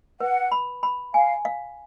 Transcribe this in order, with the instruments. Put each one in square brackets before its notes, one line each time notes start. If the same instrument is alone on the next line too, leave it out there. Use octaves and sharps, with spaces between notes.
[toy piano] B4 [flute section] F#5
[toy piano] B5
B5
[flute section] F5 [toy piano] G#5
[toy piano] F5